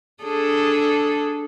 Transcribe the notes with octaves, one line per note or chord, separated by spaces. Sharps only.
D4 G#4 A4